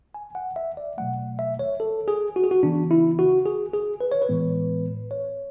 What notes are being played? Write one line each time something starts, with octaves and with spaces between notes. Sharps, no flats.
G#5
F#5
E5
D5
B2 F#3 A3 F#5
E5
C#5
A4
G#4
F#4
G#4
F#4
C#3 E3 B3 D4
E4
F#4
G#4
G#4
B4
C#5
B4
A2 E3 G#3 B3
C#5